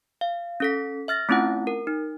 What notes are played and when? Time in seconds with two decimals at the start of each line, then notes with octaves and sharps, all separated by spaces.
0.21 F5
0.60 C#4 A4 B6
1.08 E5 F6 A6 A#6
1.29 A3 C4 C#4 E4 F4 F#5
1.67 A#4
1.87 D#4